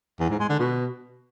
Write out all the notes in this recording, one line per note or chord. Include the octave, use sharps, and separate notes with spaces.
E2
G#2
G#3
D3
B2